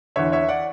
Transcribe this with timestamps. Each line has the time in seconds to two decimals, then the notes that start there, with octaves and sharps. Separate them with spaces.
0.16 E2 D3 C#5 E5
0.32 C#5 E5
0.49 D5 F#5